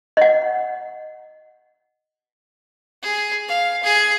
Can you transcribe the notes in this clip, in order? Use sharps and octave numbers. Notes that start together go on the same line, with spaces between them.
D#5 F#5
G#4
F5
G#4